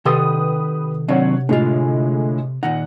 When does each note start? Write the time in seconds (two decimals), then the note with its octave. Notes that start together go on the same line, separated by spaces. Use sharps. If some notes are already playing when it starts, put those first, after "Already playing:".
0.05 C3 D#3 G4 A4 B4 C6 D#6
1.08 D#3 F#3 C4 D4 C#5 F#5
1.49 A2 D3 G#3 F4
2.63 A#2 D#3 D#4 F#5